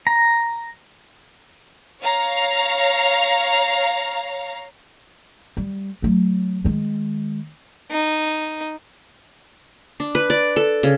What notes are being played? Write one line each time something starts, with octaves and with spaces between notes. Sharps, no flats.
A#5
C#5 F5 A#5
G3
F#3 A3
D#3 G#3
D#4
D4
B4
D5
A4
C#3